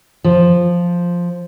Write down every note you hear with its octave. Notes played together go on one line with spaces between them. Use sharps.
F3